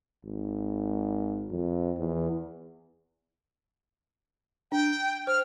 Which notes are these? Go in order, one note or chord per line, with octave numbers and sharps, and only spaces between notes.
G#1
F2
E2
D4 G5
C5 F6